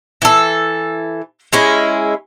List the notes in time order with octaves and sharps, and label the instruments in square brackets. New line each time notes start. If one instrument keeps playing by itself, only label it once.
[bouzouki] E3 A4
G#3 C#4 E4